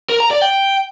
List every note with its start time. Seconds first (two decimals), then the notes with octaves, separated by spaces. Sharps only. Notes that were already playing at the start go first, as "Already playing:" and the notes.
0.09 A#4
0.20 A#5
0.31 D5
0.42 G5